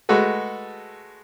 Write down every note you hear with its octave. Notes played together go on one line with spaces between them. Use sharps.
G#3 A3 F#4 A4 B4